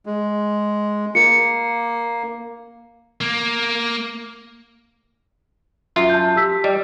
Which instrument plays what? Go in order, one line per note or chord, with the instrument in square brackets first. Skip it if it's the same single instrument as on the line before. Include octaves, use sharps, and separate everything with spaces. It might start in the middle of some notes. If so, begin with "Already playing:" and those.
[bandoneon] G#3
[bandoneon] A#3 [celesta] C#7
[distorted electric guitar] A#3
[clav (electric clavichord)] F#2 F4 [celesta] E5
[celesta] A5 G6
G4 E6 B6
[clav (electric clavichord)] G3 [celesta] D#5